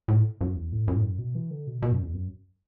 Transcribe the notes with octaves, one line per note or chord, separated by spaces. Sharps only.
A2
F#2
E2
A2
F#2
A2
F#2
B2
E3
D3
B2
B2
F#2
E2
F#2